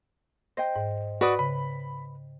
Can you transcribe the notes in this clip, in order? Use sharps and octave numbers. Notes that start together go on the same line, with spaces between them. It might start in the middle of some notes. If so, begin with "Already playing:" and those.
C5 D#5 G5 A#6
G#2
F#4 B4 D5 D#6
C#3 B5